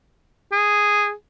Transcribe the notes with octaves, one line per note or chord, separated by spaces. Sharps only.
G#4